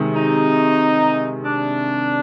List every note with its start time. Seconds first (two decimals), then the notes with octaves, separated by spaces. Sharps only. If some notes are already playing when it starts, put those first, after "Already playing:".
Already playing: C3 D#3 G#3
0.14 D#4
1.45 D4